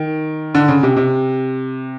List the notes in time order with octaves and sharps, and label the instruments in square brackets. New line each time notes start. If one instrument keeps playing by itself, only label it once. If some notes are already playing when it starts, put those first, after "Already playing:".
Already playing: [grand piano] D#3
D3
C#3
C3
C3